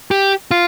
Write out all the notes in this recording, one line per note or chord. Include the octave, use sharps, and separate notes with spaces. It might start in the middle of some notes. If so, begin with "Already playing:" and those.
G4
F4